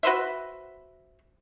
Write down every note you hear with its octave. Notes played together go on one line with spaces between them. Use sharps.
F#4 B4 C5 E5